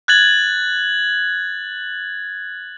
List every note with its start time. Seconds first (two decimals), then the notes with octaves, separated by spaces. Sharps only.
0.08 F#6 G#6 A6 F#7